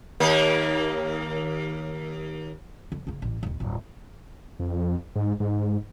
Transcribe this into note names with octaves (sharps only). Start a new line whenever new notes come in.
D#2 A#3
D3
C#3 A#3
A1
D1 D#2
D1 G2
F2
G#2
G#2